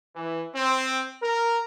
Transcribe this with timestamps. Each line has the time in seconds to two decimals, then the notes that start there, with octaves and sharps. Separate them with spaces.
0.15 E3
0.54 C4
1.23 A#4